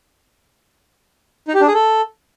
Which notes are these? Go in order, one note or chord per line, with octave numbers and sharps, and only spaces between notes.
D#4
G4
D4
G#4
A4